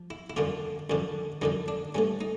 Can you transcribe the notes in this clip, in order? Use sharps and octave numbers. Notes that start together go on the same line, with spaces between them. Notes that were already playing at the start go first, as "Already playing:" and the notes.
Already playing: F3
E4
E4
F#2 D3 F3 F4
F#2 D3 F3
F#2 D3 F3 D#4
D4
G2 E3 A3 C#4
D#4